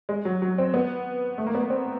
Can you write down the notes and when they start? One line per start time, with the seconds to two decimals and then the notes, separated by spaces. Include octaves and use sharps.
0.09 G#3
0.25 F#3
0.42 F#3
0.58 C4
0.74 B3
1.38 A3
1.47 A#3
1.55 B3
1.62 A#3
1.70 C4